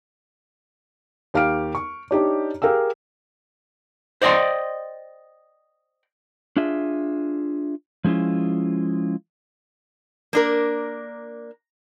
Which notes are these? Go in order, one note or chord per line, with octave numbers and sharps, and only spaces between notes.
D#2 G4 F5 G5 F6 D7
C#6
D4 D#4 G4 C#5
G4 G#4 A#4 F5 G5 E6
C5 D5 D#5 G5 C6
D4 F4 G#4 E5
F3 G#3 C#4 E4 F4
A#3 D4 A#4